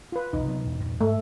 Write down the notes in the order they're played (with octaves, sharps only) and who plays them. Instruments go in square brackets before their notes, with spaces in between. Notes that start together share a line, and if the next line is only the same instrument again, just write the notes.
[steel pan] F4 B4
[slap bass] B1 E2 [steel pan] D#4
[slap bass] C3 F#3 B3
E2 G2 B2
E2 G2 A#2
[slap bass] G#2 G#3 [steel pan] A3